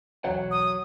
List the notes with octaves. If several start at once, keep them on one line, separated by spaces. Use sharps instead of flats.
B1 E2 B2 F#3 F#5
D#6